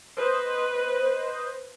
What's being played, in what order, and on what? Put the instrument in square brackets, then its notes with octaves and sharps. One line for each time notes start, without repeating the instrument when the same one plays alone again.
[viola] B4 [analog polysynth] C5 D#5